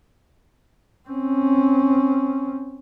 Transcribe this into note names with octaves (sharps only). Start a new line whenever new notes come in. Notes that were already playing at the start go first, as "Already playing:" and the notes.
C4 C#4